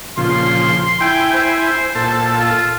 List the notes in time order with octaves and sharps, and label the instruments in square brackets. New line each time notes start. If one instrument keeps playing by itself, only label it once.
[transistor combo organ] A#2 C#3 F3 [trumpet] C6
[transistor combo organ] E4 G#5 [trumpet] G5
[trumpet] C5
[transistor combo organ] A#2 A4 A5
[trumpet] F4